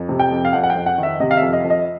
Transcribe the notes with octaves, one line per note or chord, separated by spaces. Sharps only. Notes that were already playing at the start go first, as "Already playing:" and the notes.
Already playing: F2
C3
G5
F2
F5
F2 F#5
F#5
G5
F2
F#5
D#3
E5
C3 D#5
F5
F2 E5
D#5
F2
D#5